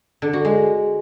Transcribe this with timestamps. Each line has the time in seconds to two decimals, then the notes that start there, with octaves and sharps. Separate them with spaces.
0.22 D3
0.33 F#4
0.45 G#3